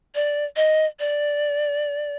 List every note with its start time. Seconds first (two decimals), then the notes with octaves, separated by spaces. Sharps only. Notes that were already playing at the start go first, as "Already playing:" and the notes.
0.15 D5
0.56 D#5
1.00 D5